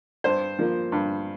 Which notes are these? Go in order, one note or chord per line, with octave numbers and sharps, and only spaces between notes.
G2 C5
F3 A#3
G2